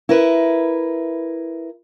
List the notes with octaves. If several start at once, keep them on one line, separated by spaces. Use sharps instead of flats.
E4 A#4 B4